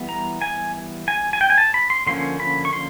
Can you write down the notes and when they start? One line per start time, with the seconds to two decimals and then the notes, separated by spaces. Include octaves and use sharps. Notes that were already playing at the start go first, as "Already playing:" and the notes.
Already playing: E3 G3 B3
0.09 A#5
0.42 G#5
1.08 G#5
1.33 G#5
1.41 G5
1.50 G#5
1.58 A5
1.74 B5
1.90 C6
2.07 D3 F3 A#3 C#4 C6
2.40 B5
2.65 C#6
2.73 C6